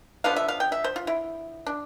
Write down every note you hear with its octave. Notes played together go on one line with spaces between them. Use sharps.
D3 F3 B3 F5
E5
F5
G5
E5
C5
F4
E4
D4